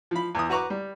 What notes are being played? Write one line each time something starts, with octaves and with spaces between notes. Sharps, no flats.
F3 B5
E2 D#6
F#4 B4 A#5 C#6 D6
G3